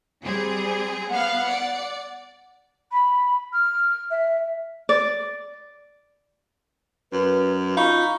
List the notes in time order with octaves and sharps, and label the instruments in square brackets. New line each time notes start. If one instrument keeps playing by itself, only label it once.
[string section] G3 C4 G#4
[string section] B3 F5 [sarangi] F#5
[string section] D5
[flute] B5
F6
E5
[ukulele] D5
[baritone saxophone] F#2 [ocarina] B4
[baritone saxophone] D#4 [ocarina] F4 [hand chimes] F5 B5 C#6